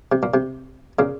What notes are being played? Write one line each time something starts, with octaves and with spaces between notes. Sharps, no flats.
C3
A#2
C3
A#2 C#3